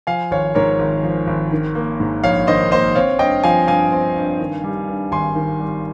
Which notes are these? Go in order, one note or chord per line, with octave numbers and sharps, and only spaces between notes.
F3 F5 G#5
G#1 C#5 F5
G#2 A#4 C#5
G#1
F3
G#1
D#3
A#3
G#2
A#1 C#5 F5
D#3 C5 D#5
A#3 C5 D#5
C4 C#5 F5
G2 D#5 G5
F3 F5 G#5
G2 F5 G#5
C4
G2
D#3
G3
G2
G#1 G#5 C6
D#3
G3